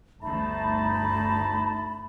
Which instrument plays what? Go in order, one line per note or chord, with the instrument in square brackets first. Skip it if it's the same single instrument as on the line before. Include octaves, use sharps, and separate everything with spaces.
[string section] G1 D2 [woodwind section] A3 D#4 [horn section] A5 [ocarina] B5